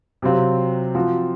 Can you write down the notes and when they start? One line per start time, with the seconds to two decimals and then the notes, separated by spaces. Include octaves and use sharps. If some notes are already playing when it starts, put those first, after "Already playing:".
0.22 C3 F#3 C4 F4
0.95 F3 C4 F#4